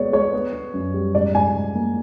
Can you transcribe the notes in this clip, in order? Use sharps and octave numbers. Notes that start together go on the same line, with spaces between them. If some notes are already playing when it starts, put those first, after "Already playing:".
Already playing: B2 G#3 B3 C#5 D5
G#3 C#5
B3
B3
F#2
G3
G#2 D5
G#2 G#5
G#2
A#3